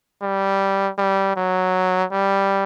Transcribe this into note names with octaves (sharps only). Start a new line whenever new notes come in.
G3
G3
F#3
G3